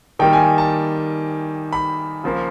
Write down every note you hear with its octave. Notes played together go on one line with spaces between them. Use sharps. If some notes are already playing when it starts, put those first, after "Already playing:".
D#3 G3 A#3 G5
G#5
A5
B5
C#3 F3 A#3